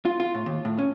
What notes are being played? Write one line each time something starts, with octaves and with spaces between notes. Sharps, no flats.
F4
F4
A2
D#2
A2
C#4